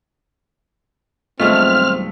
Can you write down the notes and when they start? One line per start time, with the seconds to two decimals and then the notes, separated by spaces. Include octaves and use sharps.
1.40 B1 G2 G#3 A3 C4 F4 F6